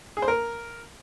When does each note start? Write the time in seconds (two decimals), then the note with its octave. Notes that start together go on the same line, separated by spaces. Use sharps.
0.17 G#4
0.22 C5
0.28 A#4